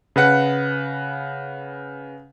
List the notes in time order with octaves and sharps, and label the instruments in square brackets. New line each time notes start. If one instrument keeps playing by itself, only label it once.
[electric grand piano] C#3 B4 F#5 C#7